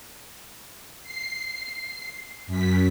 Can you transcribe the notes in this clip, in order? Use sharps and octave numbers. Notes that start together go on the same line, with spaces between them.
C7
F#2 B6